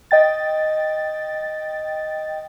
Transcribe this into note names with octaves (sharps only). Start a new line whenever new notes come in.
D#5 G5 A6